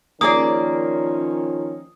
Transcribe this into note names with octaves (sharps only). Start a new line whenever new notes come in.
D#3 F3 A#3 C#4 G#4 D5 D#6